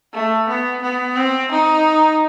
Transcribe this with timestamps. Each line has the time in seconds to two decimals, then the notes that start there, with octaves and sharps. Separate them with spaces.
0.13 A3
0.48 B3
0.82 B3
1.16 C4
1.51 D#4